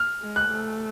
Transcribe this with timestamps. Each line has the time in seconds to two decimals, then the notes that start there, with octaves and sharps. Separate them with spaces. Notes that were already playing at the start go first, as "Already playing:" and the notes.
Already playing: F6
0.21 G#3
0.36 F#6
0.51 A3